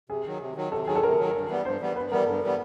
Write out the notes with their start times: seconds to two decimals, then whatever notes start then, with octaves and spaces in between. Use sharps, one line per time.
0.10 C3 G#4
0.26 D#3 F#3
0.41 C3
0.56 D#3 F#3
0.72 C3 A4
0.87 D#3 F#3 G#4
0.95 A4
1.03 C3 A#4
1.19 D#3 F#3
1.34 G2
1.49 E3 G3 B3
1.65 G2 C5
1.80 E3 G3 B3
1.96 G2 B4
2.12 E3 G3 B3 A#4
2.27 G2 A4
2.43 E3 G3 B3